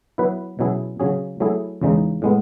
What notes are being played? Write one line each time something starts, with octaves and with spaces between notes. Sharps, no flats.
F#3 B3 E4 B4
B2 F#3 C#4 E4 G#4
C#3 F#3 C#4 G#4
F#3 A3 E4 G#4
E2 C#3 G#3 D#4
A2 G#3 B3